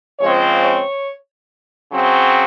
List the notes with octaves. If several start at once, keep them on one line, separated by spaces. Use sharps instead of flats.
C#3 F3 G#3 C4 C#5
C#5
C#3 F#3 C4